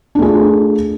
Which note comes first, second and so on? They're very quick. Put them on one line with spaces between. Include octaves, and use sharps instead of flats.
D4 A3 G#4 F4